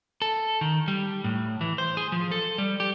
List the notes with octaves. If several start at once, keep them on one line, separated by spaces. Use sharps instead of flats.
A4
D#3
G3
A2
E3
C5
G#4
F3
A4
G3
G4